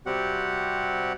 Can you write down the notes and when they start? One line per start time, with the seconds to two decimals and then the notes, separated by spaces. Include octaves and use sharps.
0.06 C3 G3 C4 F#4 G4 F#5